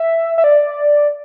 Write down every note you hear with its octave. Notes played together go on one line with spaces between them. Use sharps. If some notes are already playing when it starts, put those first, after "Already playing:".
Already playing: E5
E5
D5